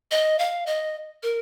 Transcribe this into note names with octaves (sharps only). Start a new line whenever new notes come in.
D#5
F5
D#5
A#4